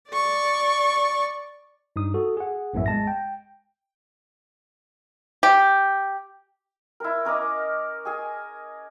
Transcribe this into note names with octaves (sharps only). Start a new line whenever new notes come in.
D5 C#6
G2 D#4 D#6
F#4 A4
G#4 F#5
A#1 F#2 A2 B3 C#4 E5
G#3 A5 A#6
G5
G4
E4 A#4
C#4 A#4 D#5 D6
G#4 G#5